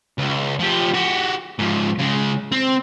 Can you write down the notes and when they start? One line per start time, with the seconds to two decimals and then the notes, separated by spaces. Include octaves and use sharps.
0.18 C#2
0.59 F3 G4
0.94 F#4 G4
1.59 G#2 F3
1.99 C#3 G#3
2.52 C4